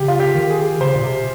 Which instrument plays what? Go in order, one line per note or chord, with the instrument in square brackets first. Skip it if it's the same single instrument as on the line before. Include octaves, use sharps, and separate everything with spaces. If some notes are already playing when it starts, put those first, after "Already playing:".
Already playing: [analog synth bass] C#3 [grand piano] G4
[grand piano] F4
G4
[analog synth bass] D#3
[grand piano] G#4
[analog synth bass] C#3 [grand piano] C5
[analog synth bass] A#2
C3